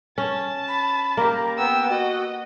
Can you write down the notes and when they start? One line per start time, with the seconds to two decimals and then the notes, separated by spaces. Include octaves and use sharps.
0.18 C#4 A5
0.68 B5
1.17 A#3 G4 A#5
1.58 B3 G5 E6
1.90 F#4 D#5